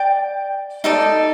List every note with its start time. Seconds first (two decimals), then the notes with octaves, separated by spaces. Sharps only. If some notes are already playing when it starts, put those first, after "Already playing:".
Already playing: D5 G5 D6
0.84 D#4 A4 D5